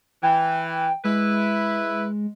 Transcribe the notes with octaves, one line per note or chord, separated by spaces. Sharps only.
E3 G5
G#3 E4 B4